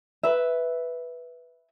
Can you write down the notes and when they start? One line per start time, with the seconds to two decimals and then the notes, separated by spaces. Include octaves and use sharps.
0.23 B4 E5